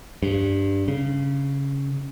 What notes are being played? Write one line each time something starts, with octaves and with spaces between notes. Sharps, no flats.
G2
C#3